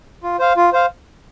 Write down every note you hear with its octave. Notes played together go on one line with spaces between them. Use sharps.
F4
C5 F5
F4
C5 F5